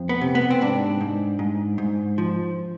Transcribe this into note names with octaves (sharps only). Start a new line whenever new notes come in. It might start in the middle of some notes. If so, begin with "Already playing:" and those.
Already playing: F2
B3
C3
B3
C4
G#2 D4
G#2
G#2
G#2
F3